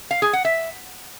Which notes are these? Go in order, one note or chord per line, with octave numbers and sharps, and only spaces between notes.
F5
G#4
F#5
E5